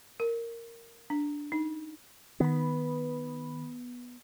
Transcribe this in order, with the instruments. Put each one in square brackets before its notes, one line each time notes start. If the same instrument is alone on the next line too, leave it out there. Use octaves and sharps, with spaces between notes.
[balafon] A#4
D4
D#4
[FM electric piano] D#3 B5 [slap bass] B3